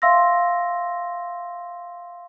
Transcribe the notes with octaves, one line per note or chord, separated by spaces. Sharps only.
E5 F5 C6 E6 A#6